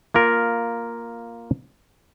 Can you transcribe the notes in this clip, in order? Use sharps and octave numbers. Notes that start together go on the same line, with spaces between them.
A#3 F4 A#4